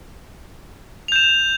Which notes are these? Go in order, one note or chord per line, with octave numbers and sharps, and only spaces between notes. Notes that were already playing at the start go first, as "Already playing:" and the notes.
G6 E7 F7